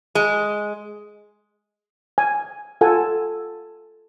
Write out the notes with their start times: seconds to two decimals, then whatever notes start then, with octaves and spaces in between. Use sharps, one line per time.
0.15 G#3
2.18 G#5
2.81 F4 A4 F#5 G#5